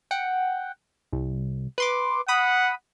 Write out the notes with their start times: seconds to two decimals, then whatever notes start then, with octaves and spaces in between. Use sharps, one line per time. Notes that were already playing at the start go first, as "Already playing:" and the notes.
0.11 F#5 G5
1.13 C2
1.78 B4 C6 D6
2.28 F#5 B5 D#6